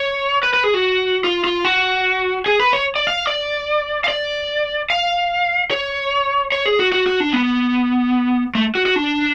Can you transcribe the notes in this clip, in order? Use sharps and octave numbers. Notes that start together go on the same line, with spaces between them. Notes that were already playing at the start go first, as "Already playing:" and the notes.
Already playing: C#5
B4
B4
G#4
F#4
F4
F4
F#4
G#4
B4
C#5
D5
F5
D5
F5
D5
F5
C#5
C#5
G#4
F#4
F#4
F#4
D4
B3
A3
F#4
F#4
D4